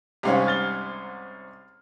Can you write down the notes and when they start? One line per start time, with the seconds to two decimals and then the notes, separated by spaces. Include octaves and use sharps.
0.23 C2 G#2 C#4 G4 F5 G#5
0.47 F6 A6 G7